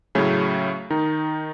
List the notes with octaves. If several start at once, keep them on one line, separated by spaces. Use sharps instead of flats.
A2 C#3 F#3 A3 C#4
D#3 D#4